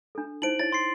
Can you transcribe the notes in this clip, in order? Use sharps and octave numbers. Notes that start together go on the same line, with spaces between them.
D4 A4
D#4 E4 C5 D7 F#7
E4 C#5 A6
C6 C7